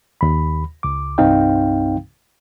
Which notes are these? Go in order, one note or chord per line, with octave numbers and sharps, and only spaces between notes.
D#2 B5
C#2 D6
C2 G2 C4 D#4 F5 G5